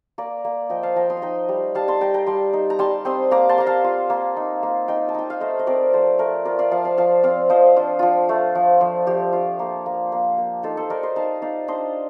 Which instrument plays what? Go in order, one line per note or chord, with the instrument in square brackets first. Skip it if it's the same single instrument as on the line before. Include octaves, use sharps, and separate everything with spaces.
[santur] A#3 A#4 D5
A#3
F3 D#5 G5
F5 A5
F3 G5 A#5
C6 D#6
F5
D#4 D#5 G5
G3
G3 F5 A5
A5 C6
G3 G5 A#5
G5 A#5
G3 A5 C6
D#4
A#5
G3 A5 C6
C4 C6 D#6
A#3 A#5 D6
A5 C6
A#3 A#5
F5 A5
F4
A#3
D#4
A#3
D#4 D#5 G5
A5
D#4 G5
F5
A3 C5 D#5
D#5
C4 A#4 D5
F3 A4 C5
A3 A#4 D5
F4 A#4 D5
D5 F5
F3 F5 A5
F5 A5
F3 F5 A5
C4 D5 F5
F3 C5 D#5
D4 F4
F3 F4
A3
F3
F3
F3 G4
F4
A#3
A#3
A#3
A#3
D#4 F4 A4
A4 C5
D#4 A#4 D5
C5 D#5
D#4 F5 A5
D#4 D5 F5
D4 C5 D#5